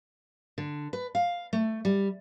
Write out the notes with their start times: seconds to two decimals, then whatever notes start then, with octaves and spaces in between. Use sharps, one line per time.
0.58 D3
0.93 B4
1.15 F5
1.53 A3
1.85 G3